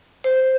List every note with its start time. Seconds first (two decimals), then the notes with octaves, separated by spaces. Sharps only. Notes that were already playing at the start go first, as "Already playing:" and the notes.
0.24 C5